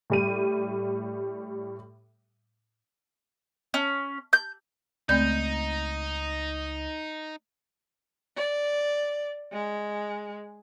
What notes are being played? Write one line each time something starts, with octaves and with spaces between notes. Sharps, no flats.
A2 G3 D#7
C#4
G6
C#2 A3 C4 D#4 D5 G6
D5
G#3